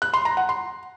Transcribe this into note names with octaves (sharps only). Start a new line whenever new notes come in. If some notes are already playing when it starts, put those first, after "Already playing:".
F#6
C6
A#5
F#5
C6